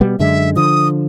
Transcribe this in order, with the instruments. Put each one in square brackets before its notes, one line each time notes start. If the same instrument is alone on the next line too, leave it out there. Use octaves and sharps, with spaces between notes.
[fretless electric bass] B2 G3 B3
[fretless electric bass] F#2 D3 G#3 [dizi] E5
[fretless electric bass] D3 F3 [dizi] D#6